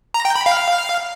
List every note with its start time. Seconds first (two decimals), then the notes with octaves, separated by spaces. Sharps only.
0.14 A#5
0.25 G5
0.36 B5
0.46 F5